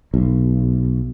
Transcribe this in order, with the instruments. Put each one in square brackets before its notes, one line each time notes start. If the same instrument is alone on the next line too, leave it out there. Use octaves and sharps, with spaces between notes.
[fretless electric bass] B1